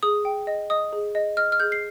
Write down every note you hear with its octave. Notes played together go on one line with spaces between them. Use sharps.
G#4 D#6
G5
D#5
D#5 D#6
G#4
D#5
D#5 F6
F6
G#4 G6
C7